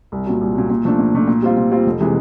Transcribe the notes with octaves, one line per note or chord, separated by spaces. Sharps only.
C2
A#2 F#3
C2
A#2 F#3
A#2
F3 A3 D4
A#2
F3 A3 D4
A#2
G3 C4 F4
A#2
G3 C4 F4
F1
C3 E3 G#3